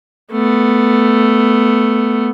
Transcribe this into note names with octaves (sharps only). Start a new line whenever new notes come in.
A3 B3